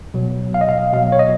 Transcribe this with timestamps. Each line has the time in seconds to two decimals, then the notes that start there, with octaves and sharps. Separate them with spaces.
0.14 B2 F#3
0.54 F5
0.61 D#5
0.69 F5
0.93 B2 F#3 F5
1.12 C#5
1.19 D#5